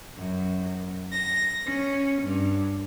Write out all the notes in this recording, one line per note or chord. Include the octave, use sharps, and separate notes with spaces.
F#2
A#6
C#4
G2